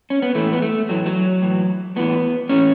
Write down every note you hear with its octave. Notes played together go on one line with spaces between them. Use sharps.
C#4
B3
A2 E3 A3
B3
A3
A2 E3 F#3
F#3
A2 E3
A2 E3 B3
A2 E3 C#4